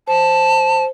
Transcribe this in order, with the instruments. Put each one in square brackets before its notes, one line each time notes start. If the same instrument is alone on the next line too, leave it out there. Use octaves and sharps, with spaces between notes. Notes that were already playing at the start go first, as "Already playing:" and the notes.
[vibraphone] C5 [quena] A5